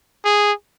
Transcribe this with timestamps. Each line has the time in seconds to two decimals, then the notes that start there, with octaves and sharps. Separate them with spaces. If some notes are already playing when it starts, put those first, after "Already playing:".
0.25 G#4